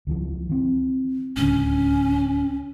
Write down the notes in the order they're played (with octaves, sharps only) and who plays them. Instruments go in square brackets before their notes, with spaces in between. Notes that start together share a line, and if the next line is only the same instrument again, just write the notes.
[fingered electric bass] C#2 E3 F3
E3 C4
[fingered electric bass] D1 C#2 D3 [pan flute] C#4